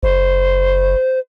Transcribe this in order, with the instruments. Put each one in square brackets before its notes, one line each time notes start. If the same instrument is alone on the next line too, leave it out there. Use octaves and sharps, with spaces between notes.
[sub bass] F#1 [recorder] C5